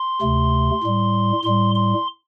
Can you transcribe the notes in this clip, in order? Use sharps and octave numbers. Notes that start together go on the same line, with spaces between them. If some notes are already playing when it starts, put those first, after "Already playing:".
Already playing: C6
D2 C3 A3
A2 G3
A2 G3 C6
C6